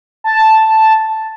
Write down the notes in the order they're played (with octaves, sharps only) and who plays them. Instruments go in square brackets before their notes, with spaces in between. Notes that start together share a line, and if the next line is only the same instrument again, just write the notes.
[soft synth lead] A5